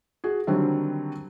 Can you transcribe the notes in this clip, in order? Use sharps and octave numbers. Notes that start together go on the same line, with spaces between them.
F#4 G#4
D3 D#3 F#3 G3 C4